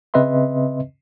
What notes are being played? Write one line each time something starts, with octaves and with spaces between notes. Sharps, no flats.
C#3 C4 B4 D#5 E5 C6